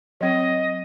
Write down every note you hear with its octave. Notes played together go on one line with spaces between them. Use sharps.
F#3 C4 D#5